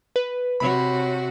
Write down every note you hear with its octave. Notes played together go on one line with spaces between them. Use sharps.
B4
C3 F#4 C#5 B5